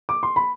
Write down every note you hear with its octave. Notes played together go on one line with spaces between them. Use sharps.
D6
C6
B5